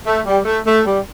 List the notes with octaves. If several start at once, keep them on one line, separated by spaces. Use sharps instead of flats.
A3
G3
A3
A3
G3